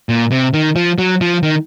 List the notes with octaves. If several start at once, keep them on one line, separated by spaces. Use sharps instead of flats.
A#2
C3
D#3
F3
F#3
F3
D#3